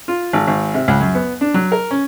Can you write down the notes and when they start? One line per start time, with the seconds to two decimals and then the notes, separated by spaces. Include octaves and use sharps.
0.08 F4
0.33 G#1
0.47 G#1
0.74 C3
0.88 C#2
1.01 F#2
1.15 B3
1.41 D4
1.54 F#3
1.72 A#4
1.91 C#4